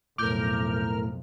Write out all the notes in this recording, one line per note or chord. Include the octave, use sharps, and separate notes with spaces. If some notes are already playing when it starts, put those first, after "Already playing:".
B1 F2 A2 A#4 D6 F6 G6